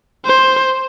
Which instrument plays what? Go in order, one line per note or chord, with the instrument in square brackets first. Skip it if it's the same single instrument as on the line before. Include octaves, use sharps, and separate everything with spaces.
[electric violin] C5